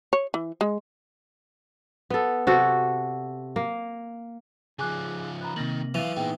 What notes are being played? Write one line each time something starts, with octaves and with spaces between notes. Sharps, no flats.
C#5
E3
G#3
B3 A4
C3 F#4 A4
A#3
C#3 F3 G#4 G#5 D6 F#6
A#5 B5 F#6
C3 D#3 A#3 F6 A#6 F#7
E3 F#3 F5 A6 D#7 F7
A#2 B3 D#4 G#4 G5